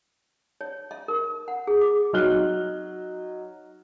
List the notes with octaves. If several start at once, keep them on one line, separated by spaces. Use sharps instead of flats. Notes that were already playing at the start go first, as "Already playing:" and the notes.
C#5
E5
A#4
F#5
G#4
D6
F#3 D#4 F6 F#6 G7